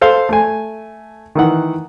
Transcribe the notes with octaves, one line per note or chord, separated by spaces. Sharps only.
A4 C5 F5
A3 G#5
D#3 E3 F#5